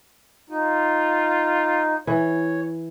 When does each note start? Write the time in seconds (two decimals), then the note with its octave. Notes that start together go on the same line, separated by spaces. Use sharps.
0.50 D#4 F4
2.07 E3 C#5